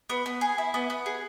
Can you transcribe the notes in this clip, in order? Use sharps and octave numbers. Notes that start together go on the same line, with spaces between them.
B3
B3
G#4
E4
B3
B3
G#4